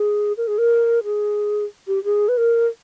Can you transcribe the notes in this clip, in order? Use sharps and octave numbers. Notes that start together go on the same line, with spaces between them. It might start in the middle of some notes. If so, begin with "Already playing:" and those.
Already playing: G#4
A#4
G#4
A#4
G#4
G4
G#4
B4
A#4